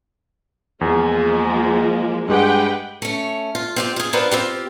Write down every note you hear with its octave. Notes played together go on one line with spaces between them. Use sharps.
E2 F3 G#3 A#3
G2 G#3 G4 B4 F#5 G5
A3 C#4
F4
C4 F4 G4
F4 G#4
C4 D4 F4 A#4 B4 F#5
C4 F4 G4